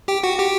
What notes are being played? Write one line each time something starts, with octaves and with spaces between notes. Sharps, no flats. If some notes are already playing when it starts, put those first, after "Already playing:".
G4 G5
F#4 F#5
G4 G5